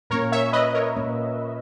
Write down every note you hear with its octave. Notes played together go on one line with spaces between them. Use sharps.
A#2 A#3 C#4 A#4 C#5
C#5 E5
B4 D#5
A#4 C#5
A#2 A#3 C#4